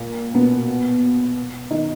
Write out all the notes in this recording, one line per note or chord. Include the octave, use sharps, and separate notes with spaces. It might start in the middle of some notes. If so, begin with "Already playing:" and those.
Already playing: A#2 A#3
B2 B3
D#3 D#4